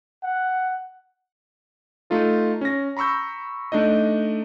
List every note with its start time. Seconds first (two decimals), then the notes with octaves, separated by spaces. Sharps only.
0.23 F#5
2.10 A3 D#4 F4 A4
2.61 C#4 A#6
2.97 A#5 B5 C#6 E6 G6
3.72 A3 D4 D#4 D#5